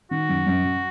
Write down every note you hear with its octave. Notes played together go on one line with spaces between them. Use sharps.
D#3 F#4
F#2
F#2
F#3